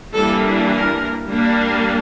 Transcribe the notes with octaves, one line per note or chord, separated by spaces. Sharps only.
E3 G3 A#3 D4 A4
A#4
G3 A#3 D4